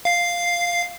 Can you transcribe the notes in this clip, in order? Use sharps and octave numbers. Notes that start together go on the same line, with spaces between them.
F5 C7